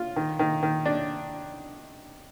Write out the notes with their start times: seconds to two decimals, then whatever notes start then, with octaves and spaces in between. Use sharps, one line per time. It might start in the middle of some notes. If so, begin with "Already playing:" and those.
Already playing: F4
0.16 D#3
0.39 D#3
0.63 D#3
0.85 D4